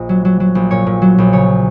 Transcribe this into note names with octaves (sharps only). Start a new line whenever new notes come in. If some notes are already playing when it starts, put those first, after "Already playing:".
Already playing: A#1 D#5
F#3
F#3
F#3
A#1
A#2 C#5
A#2
F#3
A#1
C#3 C#5